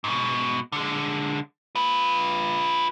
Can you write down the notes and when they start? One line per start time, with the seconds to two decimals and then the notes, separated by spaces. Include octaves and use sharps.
0.04 G#2 B2
0.72 D3 G#3
1.75 F4 B4